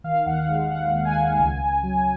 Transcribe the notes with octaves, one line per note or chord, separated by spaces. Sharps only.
D#3 F5
D#2 F#5
G#3
D#2 F#5
D#2
G#5
D#2
C#2
C#2
F#3